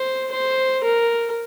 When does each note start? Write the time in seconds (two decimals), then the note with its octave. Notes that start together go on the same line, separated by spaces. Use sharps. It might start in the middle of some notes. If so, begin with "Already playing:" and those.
Already playing: C5
0.32 C5
0.84 A#4